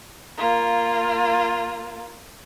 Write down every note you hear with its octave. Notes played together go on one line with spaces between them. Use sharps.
A#3 F4